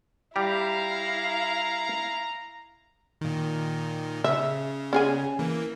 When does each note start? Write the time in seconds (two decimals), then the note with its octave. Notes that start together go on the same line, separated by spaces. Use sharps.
0.36 G3 E4 G4 F5 A#5
3.21 A#2 D#3
4.24 C#3 E5
4.93 C#4 G#4 G#5
5.39 E3 A#3